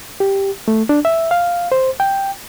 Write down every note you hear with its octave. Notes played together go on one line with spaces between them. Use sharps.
G4
A3
D4
E5
F5
C5
G5